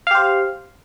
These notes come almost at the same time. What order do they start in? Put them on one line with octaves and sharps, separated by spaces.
F5 G4 C5